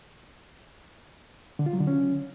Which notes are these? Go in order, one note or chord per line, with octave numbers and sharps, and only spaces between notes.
D3
F4
F#3
D3
C#4